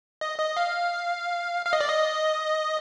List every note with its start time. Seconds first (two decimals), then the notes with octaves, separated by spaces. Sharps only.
0.21 D#5
0.38 D#5
0.57 F5
1.66 F5
1.73 D#5
1.81 D5
1.88 D#5